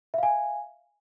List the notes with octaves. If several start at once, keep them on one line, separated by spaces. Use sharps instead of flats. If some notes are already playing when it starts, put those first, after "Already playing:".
E5 F5 G#5